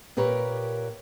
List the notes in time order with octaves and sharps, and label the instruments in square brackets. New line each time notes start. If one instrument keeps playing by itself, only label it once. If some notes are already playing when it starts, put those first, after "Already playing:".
[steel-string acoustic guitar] A#2 G4 A#4 B4 C#5